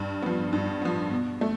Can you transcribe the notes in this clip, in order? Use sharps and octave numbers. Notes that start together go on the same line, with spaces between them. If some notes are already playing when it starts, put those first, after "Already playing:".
Already playing: G2
F3 B3
G2
F3 B3
B2
A3